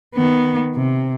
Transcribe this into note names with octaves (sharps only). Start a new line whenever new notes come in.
D#3 B3
C3